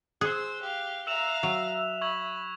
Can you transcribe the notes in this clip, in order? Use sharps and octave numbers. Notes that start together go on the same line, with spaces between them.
G#4 C5 E6 F#6
G4 F5
E5 F5 A#5 E6 E7 F7
F#3
B5 C#6 G#6 F#7